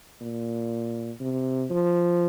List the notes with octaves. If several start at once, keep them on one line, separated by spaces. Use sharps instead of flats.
A#2
C3
F3